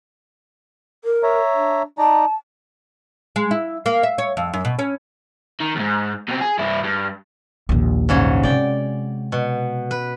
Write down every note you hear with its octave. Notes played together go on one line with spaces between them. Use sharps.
A#4
C#5 E5 A#5
D4
D#4 D5 A5 A#5
G#3
E4
A#3
E5
C#5
F2
F#2
B2
C#4
D#3
E2 G#2
B2 C4
G#4
G2 E4
G2
A#1 D#2
G#2 C#3 F#3
C3 G#3 D5 G5
B2
B4